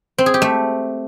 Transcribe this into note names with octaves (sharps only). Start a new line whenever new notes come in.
C4
G#4
G4
A3